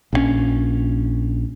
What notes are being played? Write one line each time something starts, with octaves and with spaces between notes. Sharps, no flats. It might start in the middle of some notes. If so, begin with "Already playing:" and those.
A#1 E3 C#4